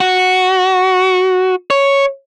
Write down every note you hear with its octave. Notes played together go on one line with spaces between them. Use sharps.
F#4
C#5